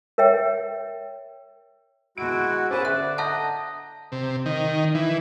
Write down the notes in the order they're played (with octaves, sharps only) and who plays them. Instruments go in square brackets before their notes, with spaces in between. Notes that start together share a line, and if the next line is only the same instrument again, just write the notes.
[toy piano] A#4 C#5 E5 G5
[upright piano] B2 D7 [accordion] G#3 F#4 [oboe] E4
[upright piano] C#4 G#4 [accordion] B4 C5 [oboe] D5
[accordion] D3 [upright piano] E5 [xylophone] F#6
[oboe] D#5 [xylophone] E5 F#5 A5 [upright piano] A#5 F#6 G6
[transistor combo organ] C3
D#3
E3